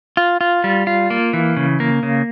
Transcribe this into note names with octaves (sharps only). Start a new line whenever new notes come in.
F4
F4
G3
F4
A#3
E3
C#3
A#3
C#3